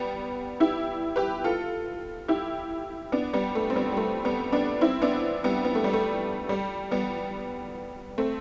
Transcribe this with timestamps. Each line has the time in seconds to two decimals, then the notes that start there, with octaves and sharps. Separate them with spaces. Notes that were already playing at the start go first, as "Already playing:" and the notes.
Already playing: G3 B3
0.60 E4 G4
1.16 G4 B4
1.44 F4 A4
2.28 E4 G4
3.12 B3 D4
3.33 G3 B3
3.55 A3
3.70 C4
3.76 G3 B3
3.92 G3
3.97 A3
4.25 G3 B3
4.52 B3 D4
4.81 C4 E4
5.02 B3 D4
5.44 G3 B3
5.65 B3
5.75 A3
5.84 G3
5.93 A3
6.49 G3
6.91 G3 B3
8.18 A3 C4